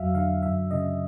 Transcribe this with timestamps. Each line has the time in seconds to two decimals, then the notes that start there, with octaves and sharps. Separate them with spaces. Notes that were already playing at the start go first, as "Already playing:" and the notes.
Already playing: F2 F#3 E5 F5
0.15 D3 F5
0.43 F#2 E5
0.71 C#3 D#5